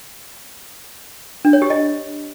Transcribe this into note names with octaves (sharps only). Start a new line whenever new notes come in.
D4
C#5
G4
D#5